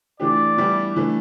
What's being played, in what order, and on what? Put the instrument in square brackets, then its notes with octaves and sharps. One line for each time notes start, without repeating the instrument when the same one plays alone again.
[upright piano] E3 A3 D4 G4 [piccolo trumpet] D5
[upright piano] E3 G3 B3 E4
E3 A3 D4